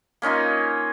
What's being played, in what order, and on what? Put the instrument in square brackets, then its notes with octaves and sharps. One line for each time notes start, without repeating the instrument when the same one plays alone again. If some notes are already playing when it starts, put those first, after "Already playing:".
[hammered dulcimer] A#3 C#4 D#4 F4